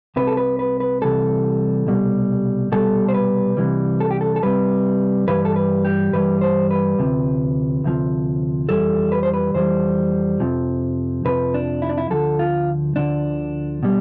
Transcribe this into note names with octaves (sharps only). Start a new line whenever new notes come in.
C2 C3 B4
A4
B4
B4
B4
C2 C3 E3 G3 A4
C2 B2 G3
C2 B2 G3 A4
C5
B4
C2 C3 E3 G3
A4
G4
A4
A4
C2 C3 E3 G3 B4
G2 E3 G3 B4
A4
B4
G4
G2 E3 G3 B4
C5
B4
D2 C3 F3
D2 C3 F3
F2 E3 G3 A4
B4
C5
B4
F2 E3 G3 C5
F2 C3 F3
F2 C3 F3 B4
D4
E4
D4
E4
D2 D3 F3 A4
F4
D2 D3 F3 D4
B2 G3